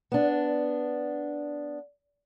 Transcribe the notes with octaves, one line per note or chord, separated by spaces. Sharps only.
B3 D4